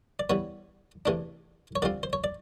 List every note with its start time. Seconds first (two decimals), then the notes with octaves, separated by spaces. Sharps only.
0.19 D5
0.30 E3 G3 B3 C#5
1.06 E2 C3 E3 A3 D4
1.76 C#5
1.82 D3 G3 C4 F4 D5
2.03 C5
2.13 C#5
2.24 D5